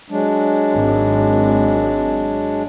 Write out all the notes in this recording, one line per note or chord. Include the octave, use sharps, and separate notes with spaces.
F#3 G#3 D4
G#1